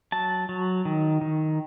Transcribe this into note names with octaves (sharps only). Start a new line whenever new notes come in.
F#3 A5
F#3
D#3
D#3